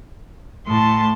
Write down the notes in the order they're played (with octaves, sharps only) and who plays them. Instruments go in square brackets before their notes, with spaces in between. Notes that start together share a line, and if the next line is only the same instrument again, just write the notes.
[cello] A2 [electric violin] A5 C6